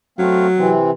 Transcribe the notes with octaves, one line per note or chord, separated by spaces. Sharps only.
F#3 A3 C4 F5
C3 E3 C4